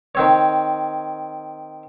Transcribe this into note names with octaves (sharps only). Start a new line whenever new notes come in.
D#3 C4 C#5